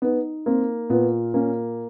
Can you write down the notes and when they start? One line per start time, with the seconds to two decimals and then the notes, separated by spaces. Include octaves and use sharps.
0.02 B3 D#4
0.46 A#3 C4
0.90 A#2 B3
1.34 A#3 C#4